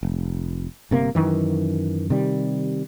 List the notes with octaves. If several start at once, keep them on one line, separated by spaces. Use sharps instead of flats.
F1
G1 C3 A#3
F#2 C3 D#3 E3
C3 D#3 G3